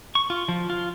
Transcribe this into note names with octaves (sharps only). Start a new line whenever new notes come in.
C#6
F4
F3
F4